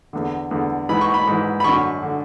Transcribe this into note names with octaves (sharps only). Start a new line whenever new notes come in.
E2 D3
E2 D3
G#2 E3 B5
C#6
B5
G#2 E3
B5
F#2 D3 C#6
D3